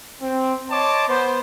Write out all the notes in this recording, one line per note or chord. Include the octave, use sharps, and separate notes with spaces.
C4
C#5 D#5 A5 C6 D6
B3 C5